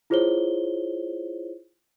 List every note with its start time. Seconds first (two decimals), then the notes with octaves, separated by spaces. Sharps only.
0.10 E4 F4 G#4 C5 C#5 G7